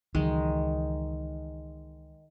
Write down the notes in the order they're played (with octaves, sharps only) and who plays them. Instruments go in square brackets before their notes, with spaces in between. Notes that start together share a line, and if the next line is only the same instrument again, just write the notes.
[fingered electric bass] C#2 E3 F#3 [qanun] D#3 G#3